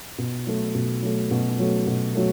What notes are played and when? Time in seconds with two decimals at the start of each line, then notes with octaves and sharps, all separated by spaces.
0.18 B2
0.47 F#3 A3
0.75 B2
1.03 F#3 A3
1.31 B2
1.59 F#3 A3
1.87 B2
2.15 F#3 A3